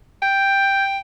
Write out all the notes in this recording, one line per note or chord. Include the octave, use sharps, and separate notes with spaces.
G5 G6